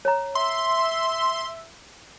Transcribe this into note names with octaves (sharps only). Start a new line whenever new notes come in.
C#5 A#5
E5 C6